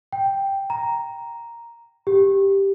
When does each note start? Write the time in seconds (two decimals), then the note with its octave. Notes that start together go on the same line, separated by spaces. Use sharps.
0.13 G5
0.70 A#5
2.07 G4